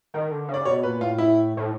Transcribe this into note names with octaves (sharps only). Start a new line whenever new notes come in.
D#3 A#4
D3
C#3
D5
B2 C#5
A#2 B4
A2 F4
E4
A2